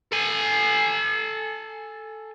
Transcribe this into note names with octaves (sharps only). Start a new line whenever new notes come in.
A4 G#5